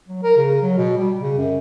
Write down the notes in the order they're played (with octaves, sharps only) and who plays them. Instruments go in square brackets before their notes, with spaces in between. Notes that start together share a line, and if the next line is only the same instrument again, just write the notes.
[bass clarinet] F#3
A#4
C#3
F#3
B2
G3
C#3
F#2